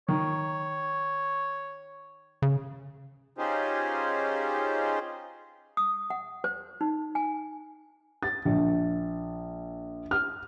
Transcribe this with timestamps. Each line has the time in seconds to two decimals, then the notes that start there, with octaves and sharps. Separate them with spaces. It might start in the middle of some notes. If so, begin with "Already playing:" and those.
0.08 D#3 C#5
2.42 C#3
3.38 C#4 D#4 F4 G4 G#4 C5
5.77 D#6
6.10 F#5
6.44 C5
6.81 D#4
7.15 G#5
8.23 A6
8.45 A#1
10.11 F6